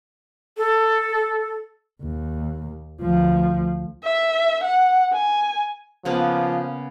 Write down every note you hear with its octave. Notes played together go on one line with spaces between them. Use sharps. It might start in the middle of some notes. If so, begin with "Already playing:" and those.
A4
D#2
D2 F3
E5
F#5
G#5
C#3 F3 A#3 B3